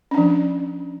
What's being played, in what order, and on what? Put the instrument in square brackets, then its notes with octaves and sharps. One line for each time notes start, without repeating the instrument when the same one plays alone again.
[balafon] C#4
D4
F3